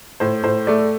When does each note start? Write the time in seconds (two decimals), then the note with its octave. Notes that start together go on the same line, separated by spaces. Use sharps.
0.20 A2 C5
0.44 A2 C5
0.67 A3 D5